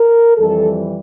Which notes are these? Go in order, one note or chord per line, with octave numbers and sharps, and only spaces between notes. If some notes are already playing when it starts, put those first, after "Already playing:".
Already playing: A#4
F2 E3 G3 A4